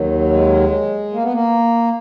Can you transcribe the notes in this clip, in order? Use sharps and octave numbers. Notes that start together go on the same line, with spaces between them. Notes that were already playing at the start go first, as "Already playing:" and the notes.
Already playing: D#2 D#3 F#3
G#3
A#3
B3
A#3